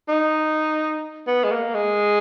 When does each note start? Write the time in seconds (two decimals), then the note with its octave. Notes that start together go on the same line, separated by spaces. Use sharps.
0.08 D#4
1.27 B3
1.44 G#3
1.51 A#3
1.75 G#3